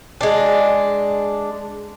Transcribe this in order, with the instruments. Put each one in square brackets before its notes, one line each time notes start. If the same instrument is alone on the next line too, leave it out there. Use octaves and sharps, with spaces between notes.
[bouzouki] G#3 D4